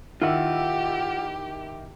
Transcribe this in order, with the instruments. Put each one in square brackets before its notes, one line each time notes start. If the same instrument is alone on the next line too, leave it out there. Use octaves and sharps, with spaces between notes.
[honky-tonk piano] D#3 E4 E6 [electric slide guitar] F4 F#5 [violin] G4